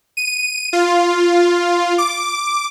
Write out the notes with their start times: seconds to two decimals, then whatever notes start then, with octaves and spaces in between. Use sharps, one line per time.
0.17 D#7
0.73 F4
1.98 D6